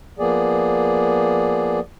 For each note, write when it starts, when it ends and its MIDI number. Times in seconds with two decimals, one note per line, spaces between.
0.19 1.80 53
0.19 1.80 58
0.19 1.80 59
0.19 1.80 68
0.19 1.80 74